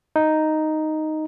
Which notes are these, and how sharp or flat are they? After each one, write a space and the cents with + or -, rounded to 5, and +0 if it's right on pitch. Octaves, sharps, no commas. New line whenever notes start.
D#4 +0